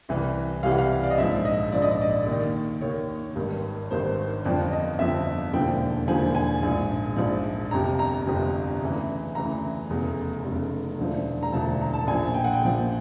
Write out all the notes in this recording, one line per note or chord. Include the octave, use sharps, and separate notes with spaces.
C2 C3 E3
C2 C3 E3 F5
F#5
F5
D5
D#5
A#1 G#2 F3 E5
D#5
A#1 G#2 F3 D5
D#5
D5
D#5
D5
D#2 D#3 D5
D#2 D#3 C#5
G#1 G2 D#3
G#1 G2 D#3 C5
G1 F2 D3 F3 D5
D#5
G1 F2 D3 F3 E5
E1 D#2 D3 F3 G5
E1 D#2 D3 F3 G#5
G#5
A#1 G#2 F3
A#1 G#2 F3
G1 F2 C3 A#5
A#5
G1 F2 C3
D2 C#3 E3
D2 C#3 E3 A#5
F1 E2 C#3
F1 E2 C#3
E1 D2 D3 F3
A#5
E1 D2 D3 F3 A5
A#5
A5
A#1 A#2 F3 G#5
G5
F#5
G5
A#1 A#2 F3